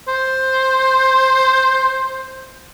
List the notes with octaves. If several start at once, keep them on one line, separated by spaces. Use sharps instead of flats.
C5